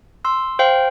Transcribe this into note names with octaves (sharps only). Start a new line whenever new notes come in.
C6 E6
C5 F5 G5